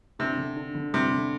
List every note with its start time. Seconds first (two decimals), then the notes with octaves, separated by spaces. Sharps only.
0.19 C3 D4
0.37 D3
0.56 D4
0.74 D3
0.93 C3 G3
1.13 D3